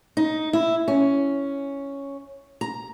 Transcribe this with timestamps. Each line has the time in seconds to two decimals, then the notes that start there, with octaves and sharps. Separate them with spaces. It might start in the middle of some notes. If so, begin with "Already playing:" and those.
0.17 D#4
0.53 E4
0.88 C#4
2.61 A#5